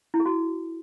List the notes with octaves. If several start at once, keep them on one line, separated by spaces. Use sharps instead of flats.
E4
G#4
F#4